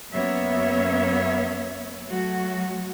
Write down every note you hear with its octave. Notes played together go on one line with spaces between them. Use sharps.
F#2 A#3 B3 C#5 E5
F#3 A3 F#4